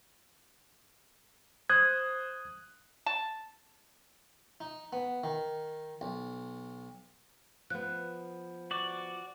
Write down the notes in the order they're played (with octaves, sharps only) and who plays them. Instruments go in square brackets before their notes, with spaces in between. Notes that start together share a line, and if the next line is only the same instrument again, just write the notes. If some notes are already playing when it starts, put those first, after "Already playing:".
[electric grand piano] C5 D#6 F#6 [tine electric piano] G#6
[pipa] A5
[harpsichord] D#4
B3
D#3
B1
[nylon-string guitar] F3 B3 [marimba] F#6
[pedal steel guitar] F#4 D5